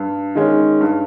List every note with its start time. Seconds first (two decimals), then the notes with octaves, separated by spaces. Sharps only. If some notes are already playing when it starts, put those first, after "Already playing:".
Already playing: G2
0.35 D#3 G#3 C#4
0.81 G2